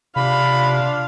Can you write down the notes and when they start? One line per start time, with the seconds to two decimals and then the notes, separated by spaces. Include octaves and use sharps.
0.16 C3 D4 F4 F5 B5